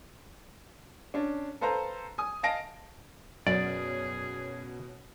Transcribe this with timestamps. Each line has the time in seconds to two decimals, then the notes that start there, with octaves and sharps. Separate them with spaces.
1.14 C#4 D4
1.61 A4 B4 C5 F5 A#5
2.18 G#5 D#6
2.43 D#5 F5 G#5 A5 A#6 D7
3.47 F#2 B2 C#4 G#4 D5